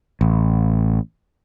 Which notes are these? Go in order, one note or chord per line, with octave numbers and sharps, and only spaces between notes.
A1